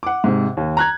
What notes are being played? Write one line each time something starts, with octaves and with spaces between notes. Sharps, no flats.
F#5 D6
G#2 C3
D#2
A#5 F#6 G#6